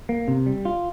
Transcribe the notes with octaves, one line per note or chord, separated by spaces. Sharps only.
A#3
C3
G3
F4